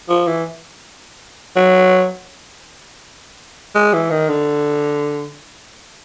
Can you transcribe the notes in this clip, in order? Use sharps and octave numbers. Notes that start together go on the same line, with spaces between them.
F3
E3
F#3
G#3
E3
D#3
D3